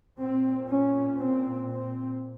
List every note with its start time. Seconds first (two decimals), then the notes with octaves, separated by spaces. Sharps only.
0.19 A#2 C4
0.69 C#4
1.19 C4
1.70 C4